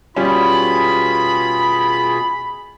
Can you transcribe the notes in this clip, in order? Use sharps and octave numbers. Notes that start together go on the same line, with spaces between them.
B2 G3 C#4 F4 G#4 B5